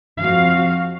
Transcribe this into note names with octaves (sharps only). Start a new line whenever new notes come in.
F2 F#4 F5